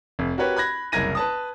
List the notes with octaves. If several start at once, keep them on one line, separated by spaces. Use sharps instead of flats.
F1
F#4 G4 A#4 B4 C#5
B5 F#6 G#6 A#6
F#1 C2 A#4 G#6 A#6 D#7
B4 A5 D#6